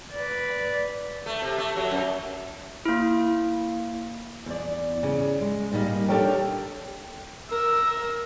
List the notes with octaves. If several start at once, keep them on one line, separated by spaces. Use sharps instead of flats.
B4 D5
A3
C3
A3
F#3
F#2
A#3 E4
E2 D5
C#3
G#3
D#2 A#2 G3 A#3 D#4
D4 G4 A4 A#4 C#5 G5
A#4 E6